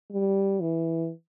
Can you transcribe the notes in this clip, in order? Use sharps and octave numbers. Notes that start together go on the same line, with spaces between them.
G3
E3